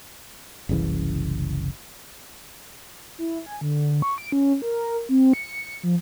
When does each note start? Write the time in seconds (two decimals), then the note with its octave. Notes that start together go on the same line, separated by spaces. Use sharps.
0.69 F#1 C2 C#3 E3
3.18 E4
3.46 G#5
3.61 D3
4.02 C#6
4.18 D7
4.32 C#4
4.62 A#4
5.09 C4
5.33 C#7
5.83 F3